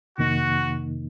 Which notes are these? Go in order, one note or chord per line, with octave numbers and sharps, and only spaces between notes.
F2 C3 D#3 A#3 D#4 F#4